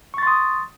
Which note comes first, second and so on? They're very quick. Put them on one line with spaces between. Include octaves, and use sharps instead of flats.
C#6 A6 C6 D#6